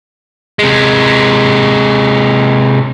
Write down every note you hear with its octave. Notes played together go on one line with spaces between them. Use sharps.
C3 G#3